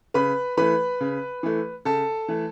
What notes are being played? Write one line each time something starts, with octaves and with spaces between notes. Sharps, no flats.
C#3 B4 B5
E3 A3 B4 B5
C#3
E3 A3
C#3 A4 A5
E3 A3